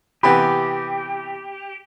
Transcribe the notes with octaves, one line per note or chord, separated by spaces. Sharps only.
C3 E3 B3 G4 B5